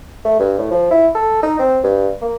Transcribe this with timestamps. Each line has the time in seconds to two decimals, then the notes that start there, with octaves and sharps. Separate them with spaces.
0.25 A3
0.39 G2
0.58 A2
0.71 F3
0.91 E4
1.15 A4
1.43 D#4
1.59 C4
1.84 G2
2.22 A#3